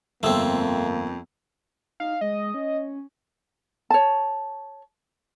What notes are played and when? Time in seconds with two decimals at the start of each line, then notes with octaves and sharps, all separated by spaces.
0.23 G1 F2 A3 A#3 C4 E6
2.00 D#4 F5
2.21 G#3 D#5
2.54 C#4
3.90 C#5 A5